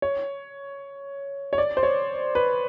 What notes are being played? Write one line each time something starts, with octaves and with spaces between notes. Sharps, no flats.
C#5
C#5
D5
C5
C#5
B4